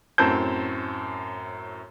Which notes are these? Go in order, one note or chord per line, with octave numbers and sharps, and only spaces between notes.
F#2 A2 C4 A5 G6